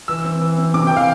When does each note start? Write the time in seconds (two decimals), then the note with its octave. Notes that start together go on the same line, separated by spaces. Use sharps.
0.08 E3 E6
0.25 C4
0.41 E3
0.58 C4
0.74 C3 D6
0.87 E3 G5
0.96 F5